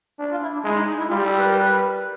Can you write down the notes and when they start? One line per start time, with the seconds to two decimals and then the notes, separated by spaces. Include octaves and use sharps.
0.19 D4
0.31 F4
0.42 E4
0.53 D4
0.64 G#3 E4
0.76 D#4
0.87 D#4
0.98 E4
1.09 G3 F4
1.24 A4
1.39 B4
1.47 A#4
1.54 B4